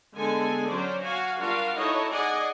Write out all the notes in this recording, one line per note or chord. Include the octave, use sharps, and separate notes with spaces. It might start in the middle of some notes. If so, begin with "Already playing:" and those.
D3 G#3 B3 A4 G#5
F#3 C#4 C5 D5
F#4 F5 G#5
G3 D4 F4 F#4 A#4 F5
D#4 E4 F#4 A4 C#5 D#5
G#4 D5 D#5 F#5 G#5